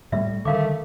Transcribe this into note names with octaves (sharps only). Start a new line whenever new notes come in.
A2 G3 A3 E5
D3 D#3 G3 A3 A#4 F5 D6